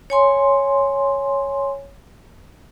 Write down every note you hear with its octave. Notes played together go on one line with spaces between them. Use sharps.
C#5 G#5 C6